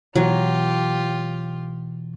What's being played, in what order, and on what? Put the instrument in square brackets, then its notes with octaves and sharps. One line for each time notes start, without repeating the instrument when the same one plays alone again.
[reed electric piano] B2 E3 [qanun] F#3 [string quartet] F4 G4